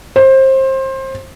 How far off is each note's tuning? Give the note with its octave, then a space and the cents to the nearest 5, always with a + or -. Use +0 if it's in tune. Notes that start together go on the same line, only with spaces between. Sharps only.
C5 +25